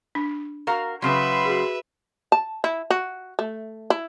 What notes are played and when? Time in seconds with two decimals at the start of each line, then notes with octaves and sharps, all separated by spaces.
0.15 D4
0.67 F#4 A#4 F5 A#5
1.02 C#3 F#3 B4 E5 F#5 B5 C6
1.45 F#4 G#4
2.32 A5
2.64 E4
2.90 F#4
3.39 A3
3.90 E4